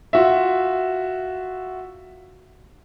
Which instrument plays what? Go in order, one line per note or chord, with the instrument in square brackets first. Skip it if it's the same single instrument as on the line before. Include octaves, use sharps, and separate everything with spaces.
[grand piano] F4 F#4 E5